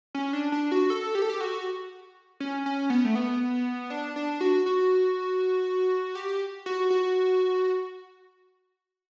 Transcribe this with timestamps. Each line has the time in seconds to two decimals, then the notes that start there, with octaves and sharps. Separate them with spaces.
0.15 C#4
0.33 D4
0.52 D4
0.72 F#4
0.90 A4
1.15 G4
1.22 A4
1.30 G4
1.40 F#4
2.40 C#4
2.66 C#4
2.90 B3
3.05 A3
3.15 B3
3.90 D4
4.16 D4
4.41 F#4
4.66 F#4
6.15 G4
6.66 F#4
6.90 F#4